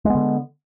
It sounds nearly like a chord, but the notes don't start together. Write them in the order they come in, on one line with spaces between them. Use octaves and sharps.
G#3 B3 D3